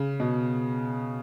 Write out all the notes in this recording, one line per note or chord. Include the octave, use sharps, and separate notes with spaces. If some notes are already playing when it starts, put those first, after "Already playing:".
Already playing: C#3
B2